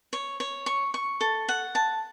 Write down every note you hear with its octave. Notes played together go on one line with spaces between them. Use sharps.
C#5
C#5
C#6
C#6
A4
F#5
A5